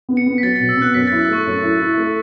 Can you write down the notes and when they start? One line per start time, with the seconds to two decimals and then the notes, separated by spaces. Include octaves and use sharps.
0.09 B3
0.17 C#7
0.26 B3
0.38 B6
0.43 F#3 A6
0.56 B2 A6
0.69 E6
0.77 B3 F#6
0.94 F#2 B6
1.07 E4 A6
1.20 E6
1.28 A3 C#6
1.46 F#2 C#6
1.63 E4
1.80 E4
1.97 A3